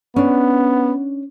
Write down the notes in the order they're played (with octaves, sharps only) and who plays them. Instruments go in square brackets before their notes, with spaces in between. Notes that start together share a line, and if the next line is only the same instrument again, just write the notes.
[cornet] B3 [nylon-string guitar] C#4 D4